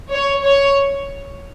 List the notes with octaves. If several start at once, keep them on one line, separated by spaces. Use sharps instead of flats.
C#5
C#5